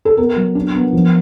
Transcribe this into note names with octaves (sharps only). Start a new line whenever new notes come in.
A4
B3 A#4
F#3
D4
B3
F3